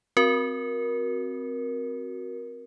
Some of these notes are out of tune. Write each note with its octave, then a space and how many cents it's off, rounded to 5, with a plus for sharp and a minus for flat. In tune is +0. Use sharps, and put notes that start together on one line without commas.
C4 +0 F#4 +0 A#4 +15